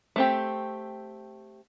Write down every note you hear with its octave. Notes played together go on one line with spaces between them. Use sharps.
A3 C4 G4